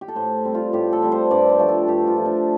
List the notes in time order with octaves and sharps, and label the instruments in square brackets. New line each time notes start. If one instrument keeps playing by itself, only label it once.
[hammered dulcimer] G4
A4
A2 C5
G3 C4
F4
A2 G4
A4
G3 C4
C5
G2 D5
C5
F3 A3
A4
G2 G4
F4
F3 A3
D4